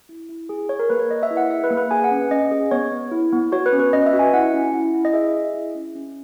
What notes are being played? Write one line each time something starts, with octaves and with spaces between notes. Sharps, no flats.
E4
E4
G#4
G#4 C#5
A#4
A#3 B4
C#5
A#3 D#5
E5
E4
F#5
G#4 E5
B4
A#3
B4
G#4 G#5
F#5
C#4
C#4 D#5
G#4
B3 C#5
B3
E4
B3
F#4 C#5
B4
C#4
B4
C#4 D#5
E5
F#4
G#5
E4 F#5
C#4
E4
E4
D#5
G#4 E5
G#4
E4
C#4
C#4